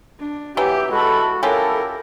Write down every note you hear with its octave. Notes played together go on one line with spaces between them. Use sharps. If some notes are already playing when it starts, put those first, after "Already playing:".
D4
E3 F#3 B3 G4 E5
G#3 F#4 A4 B5
C#4 E4 F4 G4 A4 A#4